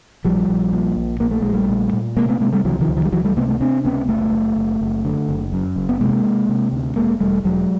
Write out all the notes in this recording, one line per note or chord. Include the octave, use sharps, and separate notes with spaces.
A#1 F3 G3
A#1
A#2
A#1
A#2 A#3
A3
A#1 G#3
G3 A3
A#2
A#2
C3 G#3 A#3
A3 B3
C3 G#3 A#3
G3 A3
C#2 E3 F#3
D#3 F3
C#2
D#3 F3
G3
C#2 E3 F#3
G3 A3
C3 A3 B3
A3 B3
C3 C4 D4
C#2 B3 C#4
F#1 A3 B3
F#1
F#1
F#1
D3
F#1
F#2
F#1
B3
C3 G#3 A#3
C3
C3
D2
E1 G#3 A#3
E1 G3 A3
E1 F#3 G#3